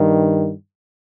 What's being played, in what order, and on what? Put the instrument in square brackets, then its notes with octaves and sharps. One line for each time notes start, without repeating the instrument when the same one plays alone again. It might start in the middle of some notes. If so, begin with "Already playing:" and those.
Already playing: [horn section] G2 D#3